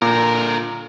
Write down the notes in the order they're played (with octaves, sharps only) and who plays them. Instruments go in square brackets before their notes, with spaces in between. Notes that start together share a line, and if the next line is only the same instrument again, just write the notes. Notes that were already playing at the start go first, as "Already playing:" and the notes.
[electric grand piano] A#2 [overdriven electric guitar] D3 A#4